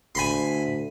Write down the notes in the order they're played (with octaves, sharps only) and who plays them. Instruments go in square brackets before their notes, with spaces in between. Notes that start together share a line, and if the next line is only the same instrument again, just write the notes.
[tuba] D2 [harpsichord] G#5 B5 C6